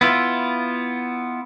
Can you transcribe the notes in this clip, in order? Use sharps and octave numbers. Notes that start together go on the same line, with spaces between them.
B3 E4 F4